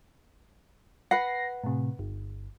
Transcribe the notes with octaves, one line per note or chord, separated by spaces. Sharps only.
B4 F#5 A#6 C7
A2 C3
G1